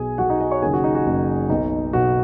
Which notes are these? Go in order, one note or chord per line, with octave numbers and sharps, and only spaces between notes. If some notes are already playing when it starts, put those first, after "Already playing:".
Already playing: B1 B2 G#4 G#5
B1 B2 F#4 F#5
D#4 D#5
D#4 D#5
C#5 C#6
F#1 F#2 D#3 G#4 G#5
F#4
D#4
F#4
F#1 F#2 D#3
B1 B2 D#4
B1 B2 F#4